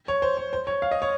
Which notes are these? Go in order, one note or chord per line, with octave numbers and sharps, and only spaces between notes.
C#5
C5
C#5
C5
C#5
F5
D#5
C#5